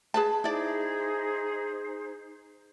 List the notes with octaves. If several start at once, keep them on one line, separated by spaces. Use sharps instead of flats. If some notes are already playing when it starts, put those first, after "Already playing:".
G#4 B4 A5
D#4 E4 G#4 C5 D5